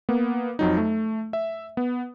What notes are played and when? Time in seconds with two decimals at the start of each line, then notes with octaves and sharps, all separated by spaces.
0.09 A#3 B3
0.59 F2 F#3 D#4
0.77 A3
1.33 E5
1.77 B3